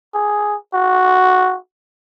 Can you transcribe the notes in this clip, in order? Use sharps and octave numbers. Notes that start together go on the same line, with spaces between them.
G#4
F#4